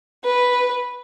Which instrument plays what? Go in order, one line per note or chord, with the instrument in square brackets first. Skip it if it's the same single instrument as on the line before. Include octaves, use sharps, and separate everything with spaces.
[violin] B4